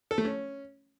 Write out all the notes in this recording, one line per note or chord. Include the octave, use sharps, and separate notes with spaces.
A4
A3
C#4